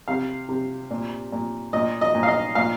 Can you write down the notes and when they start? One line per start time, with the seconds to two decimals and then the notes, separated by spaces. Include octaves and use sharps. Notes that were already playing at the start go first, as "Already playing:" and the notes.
0.08 C3 F5
0.49 C3
0.91 A#2
1.32 A#2
1.73 A#2 D#5
2.01 D#5
2.15 A#2
2.23 F5
2.28 D#5
2.55 A#2 F5